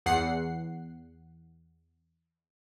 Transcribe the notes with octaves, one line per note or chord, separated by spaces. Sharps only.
E2 F#5 C7